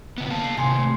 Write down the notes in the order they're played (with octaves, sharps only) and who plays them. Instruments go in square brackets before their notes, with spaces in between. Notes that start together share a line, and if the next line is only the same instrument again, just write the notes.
[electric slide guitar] C#3 B3
A#3 F5 A5
[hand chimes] C7
[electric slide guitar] C3 D#3 [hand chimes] G#5 C6 C#7
[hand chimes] A3 G#5